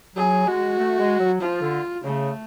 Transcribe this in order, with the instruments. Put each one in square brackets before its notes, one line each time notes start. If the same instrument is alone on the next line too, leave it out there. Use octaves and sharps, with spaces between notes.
[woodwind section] F#3 [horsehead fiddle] G#4
[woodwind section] G#3 [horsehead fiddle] F#4
[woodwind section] A3
G#3
F#3
[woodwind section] F3 [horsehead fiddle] F4
[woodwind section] D3
[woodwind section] C#3 [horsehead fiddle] A3